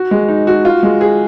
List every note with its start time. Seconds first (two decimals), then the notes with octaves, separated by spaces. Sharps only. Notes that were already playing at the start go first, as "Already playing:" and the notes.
Already playing: F#4
0.11 G#3
0.28 D#4
0.47 F#4
0.65 F4
0.83 G#3
1.01 G#4